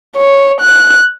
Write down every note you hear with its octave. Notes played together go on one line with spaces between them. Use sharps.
C#5
F#6